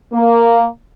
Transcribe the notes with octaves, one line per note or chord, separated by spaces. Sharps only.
A#3